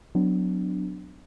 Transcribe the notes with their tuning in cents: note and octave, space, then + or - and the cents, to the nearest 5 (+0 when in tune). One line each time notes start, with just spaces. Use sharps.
F#3 -10 B3 +30 D4 +0